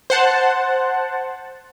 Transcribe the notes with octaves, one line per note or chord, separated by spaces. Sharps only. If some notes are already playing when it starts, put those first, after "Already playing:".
C5 F#5 A5